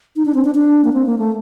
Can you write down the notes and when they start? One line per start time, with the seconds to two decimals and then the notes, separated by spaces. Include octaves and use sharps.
0.16 D#4
0.25 D4
0.35 C4
0.44 D4
0.55 D4
0.84 A#3
0.93 C4
1.06 A#3
1.18 A3